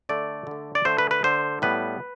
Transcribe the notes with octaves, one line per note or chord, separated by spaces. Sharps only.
D3 A3 D5
D3 A3
D5
D3 A3 C5
B4
B4
D3 A3 C5
A2 G3 B3 B4